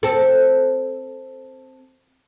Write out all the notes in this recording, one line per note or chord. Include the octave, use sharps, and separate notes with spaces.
C4 A4